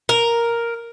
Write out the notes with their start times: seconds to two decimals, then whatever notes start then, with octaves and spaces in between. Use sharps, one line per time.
0.09 A#4